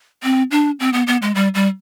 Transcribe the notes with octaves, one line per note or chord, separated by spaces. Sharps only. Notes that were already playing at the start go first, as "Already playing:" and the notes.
C4
D4
C4
B3
B3
G#3
G3
G3